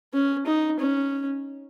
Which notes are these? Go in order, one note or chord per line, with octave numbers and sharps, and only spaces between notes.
C#4
D#4
C#4